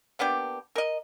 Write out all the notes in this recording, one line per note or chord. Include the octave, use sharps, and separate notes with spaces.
A#3 B3 D4 G4
A#4 D#5